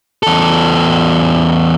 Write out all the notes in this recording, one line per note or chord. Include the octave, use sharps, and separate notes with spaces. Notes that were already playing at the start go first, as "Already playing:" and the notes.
E2 A4